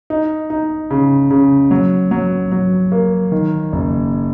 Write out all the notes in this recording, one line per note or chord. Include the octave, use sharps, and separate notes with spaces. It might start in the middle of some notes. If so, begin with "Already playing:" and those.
D#4
D#4
C#3
C#3
F#3
F#3
F#3
A#3
D#3
F#1